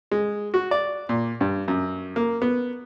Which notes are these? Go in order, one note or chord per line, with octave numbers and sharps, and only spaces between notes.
G#3
F#4
D5
A#2
G2
F#2
A#3
B3